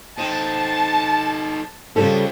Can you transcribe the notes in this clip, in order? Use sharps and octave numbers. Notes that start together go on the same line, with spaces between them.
C4 D#4 A4 A5
C#3 G3 C4 C#4 F4 A4